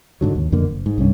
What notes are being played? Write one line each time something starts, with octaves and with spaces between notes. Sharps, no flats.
G#2 D3 F#3
D#2
F2 D3 A#3
F#1
G#2
C2 G2 C#4